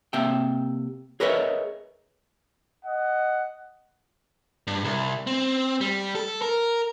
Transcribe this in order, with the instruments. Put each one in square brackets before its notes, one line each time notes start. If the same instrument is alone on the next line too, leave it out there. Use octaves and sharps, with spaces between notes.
[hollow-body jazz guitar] C3 A#3 E5 G5
G#4 A#4 B4 C#5 D#5 E5
[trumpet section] D#5 F#5
[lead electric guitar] G2
C2
C4
G3
A4
A#4